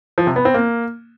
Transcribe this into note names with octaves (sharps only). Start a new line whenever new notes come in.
F3
C3
B3
C4
A#3